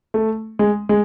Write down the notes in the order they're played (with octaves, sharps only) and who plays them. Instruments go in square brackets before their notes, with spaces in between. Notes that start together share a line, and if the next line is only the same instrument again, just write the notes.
[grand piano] A3
G#3
G#3